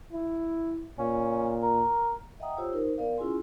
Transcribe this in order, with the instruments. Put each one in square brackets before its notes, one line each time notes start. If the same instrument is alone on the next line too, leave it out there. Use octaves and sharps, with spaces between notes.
[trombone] E4
[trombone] A#2 [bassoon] C#4
[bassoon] A#4
[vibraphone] D#5 E5 F#5 G5 A#5 D#6
F4 G4 C5 C#5 E6
D#4 A#4 C5
B3 A#4 D5 F5
C#4 E4 F4 G#4 G#5 C6